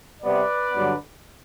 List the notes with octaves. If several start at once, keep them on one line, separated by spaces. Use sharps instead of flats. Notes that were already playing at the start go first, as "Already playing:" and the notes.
C3 G3 B3 B4 D5
G2 D3 F#3 B3